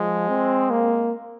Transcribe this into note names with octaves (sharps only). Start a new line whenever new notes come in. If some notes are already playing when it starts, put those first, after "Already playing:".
Already playing: F3 G#3
C4
A#3